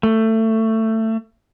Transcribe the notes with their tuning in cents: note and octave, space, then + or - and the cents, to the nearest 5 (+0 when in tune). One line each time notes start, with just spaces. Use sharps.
A3 +20